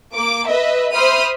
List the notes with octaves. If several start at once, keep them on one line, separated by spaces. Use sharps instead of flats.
A#3 D6
B4 D#5 E5
C5 E5 B5 C6 D#6 F6